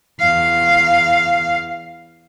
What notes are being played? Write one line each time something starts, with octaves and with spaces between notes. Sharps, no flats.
E2 F5